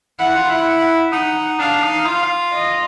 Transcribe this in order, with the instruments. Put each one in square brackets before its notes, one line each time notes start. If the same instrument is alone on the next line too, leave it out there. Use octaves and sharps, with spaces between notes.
[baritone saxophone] E4 [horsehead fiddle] F#5
[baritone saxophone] F4
E4
[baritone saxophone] D#4 [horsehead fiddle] F#5
[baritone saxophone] D4 [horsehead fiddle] F5
[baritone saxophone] D#4
F4
[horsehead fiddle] D#5